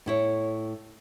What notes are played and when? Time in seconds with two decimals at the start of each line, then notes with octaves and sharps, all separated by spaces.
0.06 A2 E4 C#5